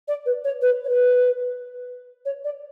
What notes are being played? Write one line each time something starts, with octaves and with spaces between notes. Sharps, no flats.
D5
B4
C#5
B4
C#5
B4
C#5
D5